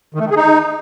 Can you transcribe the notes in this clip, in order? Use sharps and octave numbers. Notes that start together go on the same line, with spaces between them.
D#3
A3
D#3
G#4
D#4